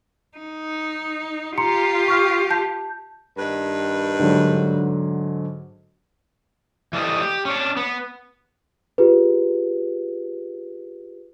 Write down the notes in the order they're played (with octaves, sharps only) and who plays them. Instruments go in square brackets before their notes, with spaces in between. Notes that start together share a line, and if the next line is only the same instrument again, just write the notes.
[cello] D#4
[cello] F4 G4 [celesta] A#5 C6 C#7
[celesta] C#6 F6
A5 G6
[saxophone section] G2 D#3 B4
[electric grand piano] G#2 D3 F#3
[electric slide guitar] E3 G3 A4 D#5
G4
C#4 D4
B3
[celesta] F4 G4 G#4 B4